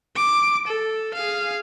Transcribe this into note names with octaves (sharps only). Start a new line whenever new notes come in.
D6
A4
G#4 F5